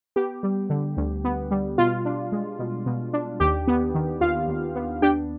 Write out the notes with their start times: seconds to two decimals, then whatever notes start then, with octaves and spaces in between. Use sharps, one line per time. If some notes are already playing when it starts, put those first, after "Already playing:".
0.16 B3 G4
0.43 G3
0.70 D3
0.97 D2
1.25 B3
1.51 G3
1.78 B2 F4
2.05 D4
2.32 G#3
2.59 B2
2.86 B2
3.13 D4
3.40 D#2 G4
3.68 B3
3.95 D#3
4.21 D#2 F4 F5
4.48 D#2
4.75 B3
5.02 D4 G4 G5